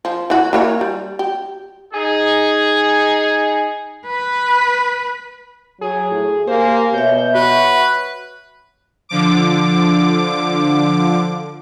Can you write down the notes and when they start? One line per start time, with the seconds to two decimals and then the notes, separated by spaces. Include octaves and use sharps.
0.05 F3
0.30 E3 E4 F#4
0.53 E3 A#3 C#5
0.81 G3
1.19 G4
1.94 D#4 G#4
4.07 B4
5.81 F#3 G#4
6.11 A2
6.48 A#3 G4 C5 G#5
6.94 B2 C#5 E5 G6
7.35 F#4 B4
9.09 D3 F3 D6